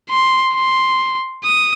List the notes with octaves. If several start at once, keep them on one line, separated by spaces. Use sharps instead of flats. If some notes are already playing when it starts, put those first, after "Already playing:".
C6
C6
D#6